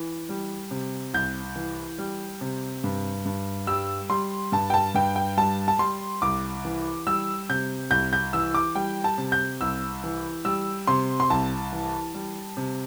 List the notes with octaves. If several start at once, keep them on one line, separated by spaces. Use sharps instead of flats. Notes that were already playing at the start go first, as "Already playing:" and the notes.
Already playing: E3
G3
C3
C2 G6
E3
G3
C3
G2
G2
G3 E6
G3 C6
G2 A5
G5
A5
G2 G5
G5
G3 A5
A5
G3 C6
C2 D6
E3
G3 E6
C3 G6
C2 G6
G6
E3 E6
D6
G3 G5
A5
C3
G6
C2 E6
E3
G3 E6
C3 C6
C6
C2 A5
E3
G3
C3